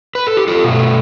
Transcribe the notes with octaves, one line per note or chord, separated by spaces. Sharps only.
B4
A4
G4
F4 A4
B2 A3